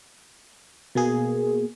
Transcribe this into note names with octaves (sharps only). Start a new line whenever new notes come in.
B2 A#3 G#4